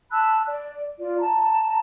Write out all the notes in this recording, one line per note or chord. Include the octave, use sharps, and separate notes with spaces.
A5 B5 E6 F#6
D5
F4 D5
A5 A#5